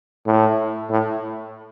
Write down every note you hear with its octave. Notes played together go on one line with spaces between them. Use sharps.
A2
A2